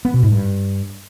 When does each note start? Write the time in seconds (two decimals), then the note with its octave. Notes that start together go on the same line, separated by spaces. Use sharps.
0.05 B3
0.14 B2
0.23 G#2
0.32 G2